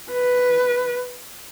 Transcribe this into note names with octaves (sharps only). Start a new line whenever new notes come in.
B4